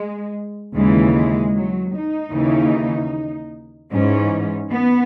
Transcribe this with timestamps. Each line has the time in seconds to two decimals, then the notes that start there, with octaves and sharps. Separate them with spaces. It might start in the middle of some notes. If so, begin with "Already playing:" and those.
Already playing: G#3
0.74 D#2 C#3 E3 G#3
1.13 G#3
1.54 F#3
1.93 D#4
2.33 D#2 C#3 E3
3.91 G#2 E3 C#4
4.71 B3